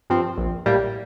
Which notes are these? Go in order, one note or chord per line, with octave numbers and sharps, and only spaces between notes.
G2 F3 C4
A#1
A2 G3 A#3